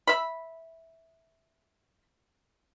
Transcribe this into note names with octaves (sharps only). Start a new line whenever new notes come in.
E5 B5